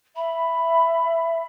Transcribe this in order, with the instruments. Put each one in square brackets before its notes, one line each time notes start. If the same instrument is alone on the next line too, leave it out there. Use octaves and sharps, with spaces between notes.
[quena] E5 [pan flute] B5